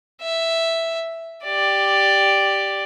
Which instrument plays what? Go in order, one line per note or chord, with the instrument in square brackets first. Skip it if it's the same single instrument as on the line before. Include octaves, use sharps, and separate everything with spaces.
[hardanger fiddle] E5
G4 D5